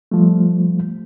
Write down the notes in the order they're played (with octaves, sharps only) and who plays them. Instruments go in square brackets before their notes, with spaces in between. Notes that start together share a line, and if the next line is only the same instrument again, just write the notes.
[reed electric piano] F3 G3 A3